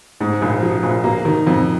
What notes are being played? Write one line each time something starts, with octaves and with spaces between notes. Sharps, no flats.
G#2
A#1
F3
A#1
A#3
D#3
F2